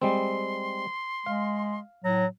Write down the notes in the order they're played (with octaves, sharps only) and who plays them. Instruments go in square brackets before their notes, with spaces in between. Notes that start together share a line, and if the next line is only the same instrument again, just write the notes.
[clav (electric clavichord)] G3 G#3 C4 [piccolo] C6
[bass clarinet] G#3 [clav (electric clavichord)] F5
[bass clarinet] A2 [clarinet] F#3 [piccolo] A#6